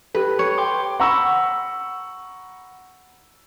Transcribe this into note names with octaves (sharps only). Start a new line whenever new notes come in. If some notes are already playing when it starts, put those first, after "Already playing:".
G4 A4 B4
C#5
G5 C6 D6
F#5 A#5 B5 C#6 E6